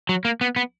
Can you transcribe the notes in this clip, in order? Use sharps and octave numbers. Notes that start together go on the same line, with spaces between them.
F#3
A#3
B3
B3